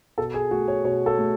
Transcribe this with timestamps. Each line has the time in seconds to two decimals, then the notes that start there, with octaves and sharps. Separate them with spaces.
0.18 B2 A4
0.34 G#4
0.51 A3 F#4
0.68 C#5
0.84 B2 C#5
1.06 A4
1.18 A3